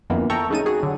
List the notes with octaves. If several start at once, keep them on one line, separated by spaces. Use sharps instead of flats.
F2 D3 E3 A#3 B3
A4 E5 G5 A#5 C#6
C#3 A3 D#4 A5 D#7
F#4 G#4
D3 F#3